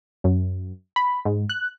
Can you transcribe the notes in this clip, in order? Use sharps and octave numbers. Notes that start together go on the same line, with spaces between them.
F#2
B5
G#2
F#6